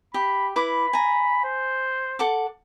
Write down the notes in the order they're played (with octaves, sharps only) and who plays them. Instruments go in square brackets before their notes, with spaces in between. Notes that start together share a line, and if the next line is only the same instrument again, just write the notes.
[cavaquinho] G4 [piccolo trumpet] B5
[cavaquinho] E4 B4 D6 [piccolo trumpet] B5
[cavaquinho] G#5 A#5
[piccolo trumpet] C5
[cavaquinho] A4 F#5 D6